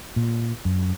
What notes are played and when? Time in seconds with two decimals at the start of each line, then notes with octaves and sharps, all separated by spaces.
0.16 A#2
0.65 F#2